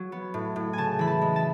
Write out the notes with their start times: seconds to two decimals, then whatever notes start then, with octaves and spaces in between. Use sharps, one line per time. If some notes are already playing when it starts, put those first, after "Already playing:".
Already playing: F#3
0.12 B3
0.34 A2
0.56 A2
0.73 C#3 G#5 A5
0.99 E3 B5
1.07 A5
1.21 G#3
1.36 A5